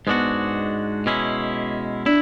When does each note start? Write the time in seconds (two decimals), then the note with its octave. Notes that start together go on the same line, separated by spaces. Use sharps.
0.07 G#2 G#3 B3 D4 F#4
1.06 B2 G#3 C#4 E4
2.06 D4 E4